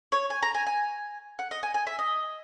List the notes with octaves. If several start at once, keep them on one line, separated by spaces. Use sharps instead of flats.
C#5
G#5
A#5
G#5
G#5
F#5
D#5
G#5
G#5
E5
D#5